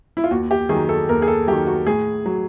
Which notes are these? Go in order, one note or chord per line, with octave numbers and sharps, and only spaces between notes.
E4
F4
D#2 F#4
G4
D#3 F#3 G#4
A4
D#2 A#4
G#4
A4
D#3 F#3 G4
F#4
A2 G#4
F#3